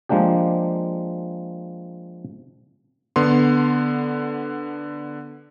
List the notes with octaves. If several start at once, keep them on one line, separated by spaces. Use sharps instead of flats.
F3 G#3 A#3 D4 G4
D3 B3 C6